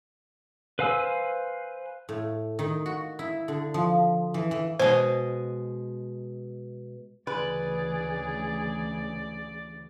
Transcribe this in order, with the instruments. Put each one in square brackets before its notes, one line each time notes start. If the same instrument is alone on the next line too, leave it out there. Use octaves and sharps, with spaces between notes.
[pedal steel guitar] B4 C5 F5 G#5 E6
[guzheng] A2
D#3
F#4
E4
D3
F3
E3
E3
[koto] B2 G#3 [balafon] C5
[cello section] D2 C#3 E3 [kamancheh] G#4 [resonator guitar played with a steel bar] B4 [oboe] D5